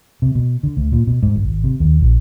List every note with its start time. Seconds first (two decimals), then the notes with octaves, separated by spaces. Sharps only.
0.22 C3
0.35 B2
0.63 D3
0.77 D2
0.92 A#2
1.07 B2
1.23 G#2
1.36 G1
1.48 G#1
1.64 C3
1.80 D#2
2.01 A#1